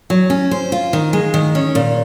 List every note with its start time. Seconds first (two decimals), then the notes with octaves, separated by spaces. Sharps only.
0.10 F#3
0.30 C#4
0.51 C5
0.72 F4
0.93 D#3
1.13 G#3
1.34 D#3
1.55 C#4
1.75 A#2